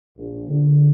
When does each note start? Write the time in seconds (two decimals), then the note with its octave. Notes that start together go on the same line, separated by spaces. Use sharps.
0.17 A#1
0.48 D3